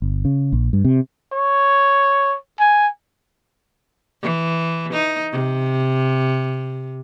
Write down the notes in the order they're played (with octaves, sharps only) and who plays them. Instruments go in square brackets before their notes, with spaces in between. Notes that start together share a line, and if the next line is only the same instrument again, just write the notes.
[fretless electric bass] G1
C#3
A#1
G2
C3
[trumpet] C#5
G#5
[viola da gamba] E3
D#4
C3